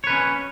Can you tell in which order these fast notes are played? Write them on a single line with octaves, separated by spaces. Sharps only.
C#5 B4 C#4